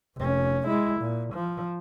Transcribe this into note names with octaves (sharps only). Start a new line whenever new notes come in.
F1 C#4
G#3 E4
A#2
F3